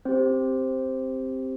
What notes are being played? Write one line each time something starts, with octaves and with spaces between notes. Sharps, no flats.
C4 G4 C5